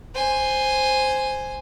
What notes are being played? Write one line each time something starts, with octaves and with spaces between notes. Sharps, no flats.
C5 G#5